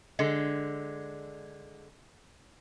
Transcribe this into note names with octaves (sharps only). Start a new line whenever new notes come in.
D3 G#3